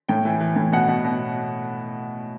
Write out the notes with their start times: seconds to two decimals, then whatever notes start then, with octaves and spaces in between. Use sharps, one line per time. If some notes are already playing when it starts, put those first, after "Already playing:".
0.09 A2 G5
0.25 E3
0.40 E3
0.56 A2
0.72 B2 F#5
0.88 B2
1.04 B2